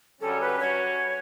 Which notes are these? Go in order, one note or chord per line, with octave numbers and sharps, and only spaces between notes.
F#2 D3 G3 C#4 A4
B4
F#3 C#4 F#4 B4 C#5